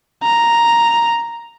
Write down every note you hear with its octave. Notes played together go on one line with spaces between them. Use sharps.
A#5